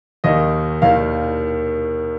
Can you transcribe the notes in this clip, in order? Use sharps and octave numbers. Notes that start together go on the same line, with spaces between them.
D#2 D#3 D#5
D#2 D#3 F5